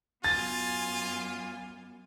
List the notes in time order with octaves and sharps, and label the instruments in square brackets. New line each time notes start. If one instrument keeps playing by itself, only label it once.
[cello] F#2 B3 [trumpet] F4 [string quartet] G#5 [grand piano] A6